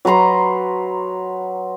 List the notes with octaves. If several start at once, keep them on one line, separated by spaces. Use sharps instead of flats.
F#3 B4 A#5 C6